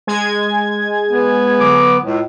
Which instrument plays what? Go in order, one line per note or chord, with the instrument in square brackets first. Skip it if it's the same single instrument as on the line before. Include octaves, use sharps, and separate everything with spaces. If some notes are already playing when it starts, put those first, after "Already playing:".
[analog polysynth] G#3 G#5 G#6
[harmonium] B3
[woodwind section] D3 F#3 D6
C#2 A2